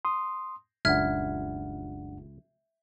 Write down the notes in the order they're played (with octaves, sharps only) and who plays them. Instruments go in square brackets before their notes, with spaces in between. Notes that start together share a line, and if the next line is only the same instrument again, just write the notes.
[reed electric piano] C6 D#6
[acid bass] D#1 [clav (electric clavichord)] C#2 [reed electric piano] F#2 D4 F#5 [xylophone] E5 F6 G#6